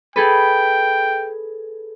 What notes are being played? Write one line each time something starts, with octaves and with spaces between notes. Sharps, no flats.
G#4 A4 B4 G5